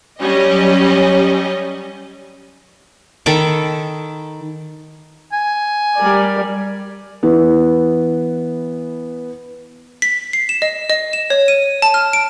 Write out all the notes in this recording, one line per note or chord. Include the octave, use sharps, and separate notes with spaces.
F#3 G3 C#4 D#5
D#3 A4 B5 D6
G#5
G3 A#4 D5
E3 B3
B6
C7
E7
D#5
D#5
E7
C#5
D#7
A5
F6
D7